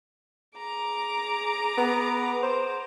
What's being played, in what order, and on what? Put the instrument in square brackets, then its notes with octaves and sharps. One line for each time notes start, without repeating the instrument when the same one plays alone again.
[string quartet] G#4 A#5 D6
[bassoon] B3
C5